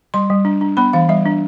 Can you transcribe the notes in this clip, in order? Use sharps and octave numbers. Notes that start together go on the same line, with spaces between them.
G3 C6
G3
D4
D4
B3 B5
E3 F5
G3 E5
D4